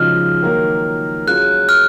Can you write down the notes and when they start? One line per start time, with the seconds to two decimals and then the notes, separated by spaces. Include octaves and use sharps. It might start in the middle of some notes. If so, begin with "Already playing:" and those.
Already playing: C#3 F3 G#3 D#4 F#4 F6
0.43 D#3 F#3 A#3
1.27 F#3 C#4 F4 G#4 F#6
1.69 F6